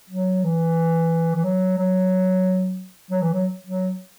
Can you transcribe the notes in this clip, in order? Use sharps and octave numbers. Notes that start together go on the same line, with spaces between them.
F#3
E3
E3
F#3
F#3
F#3
E3
F#3
F#3